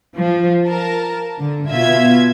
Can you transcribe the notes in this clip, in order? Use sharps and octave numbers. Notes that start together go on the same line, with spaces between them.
F3
A#4 A5
D3
B2 F4 E5 G#6